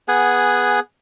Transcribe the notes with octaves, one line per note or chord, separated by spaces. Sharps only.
B3 G#4 F#5 G#5